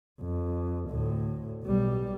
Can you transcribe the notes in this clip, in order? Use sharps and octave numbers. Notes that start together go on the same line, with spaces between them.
F2
D2 A2
B1 G3